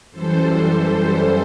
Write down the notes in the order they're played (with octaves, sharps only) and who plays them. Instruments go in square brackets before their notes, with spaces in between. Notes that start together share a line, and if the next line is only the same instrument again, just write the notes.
[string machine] F#2 E3 G3 A4 C5